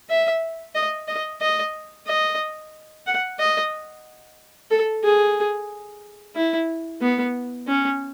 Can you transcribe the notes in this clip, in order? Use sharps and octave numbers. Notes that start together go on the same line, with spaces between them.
E5
D#5
D#5
D#5
D#5
F#5
D#5
A4
G#4
E4
B3
C#4